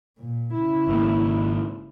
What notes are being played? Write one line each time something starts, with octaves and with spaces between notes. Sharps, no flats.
A#2
C#3 E4
G#1 G#2 A#3